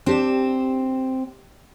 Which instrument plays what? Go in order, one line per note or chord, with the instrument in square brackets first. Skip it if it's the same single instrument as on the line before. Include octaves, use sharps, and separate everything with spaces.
[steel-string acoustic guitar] C4 [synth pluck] D4 G4 E7